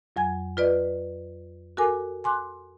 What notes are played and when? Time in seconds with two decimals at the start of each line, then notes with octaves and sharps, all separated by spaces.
0.16 F2 F#3 G#5 G#6
0.57 F4 B4 D5 D#5
1.77 F#4 A4 A#4 G#5 D6
2.24 G#5 C6 D6 F#6